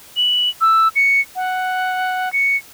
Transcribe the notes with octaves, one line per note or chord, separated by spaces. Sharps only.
F#7
E6
C#7
F#5
C#7